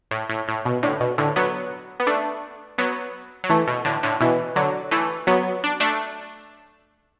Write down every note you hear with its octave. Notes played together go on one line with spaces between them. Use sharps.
A2
A2
A2
B2
A2 D3
B2
A2 D3
F#3 B3
B3
A3 D4
F#3 B3
F#3
E3 A3
B2
A2 D3
A2 D3
B2 E3
D3 F#3
E3 A3
F#3 B3
D4
A3 D4